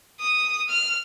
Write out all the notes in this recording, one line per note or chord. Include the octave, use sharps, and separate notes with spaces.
D#6
F6